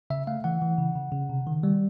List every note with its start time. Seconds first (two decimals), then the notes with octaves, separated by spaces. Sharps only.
0.10 C#3 E5
0.27 A3 F5
0.44 E3 F#5
0.62 E3
0.78 C#3
0.96 C#3
1.12 C#3
1.30 C3
1.47 D#3
1.63 G3